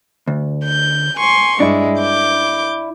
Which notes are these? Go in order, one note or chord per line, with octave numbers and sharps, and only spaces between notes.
D2
G6
G#5 C6 C#6
G2 G#3 D4 E4
D6 G6